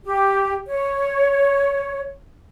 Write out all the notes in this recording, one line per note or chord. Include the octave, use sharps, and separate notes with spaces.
G4
C#5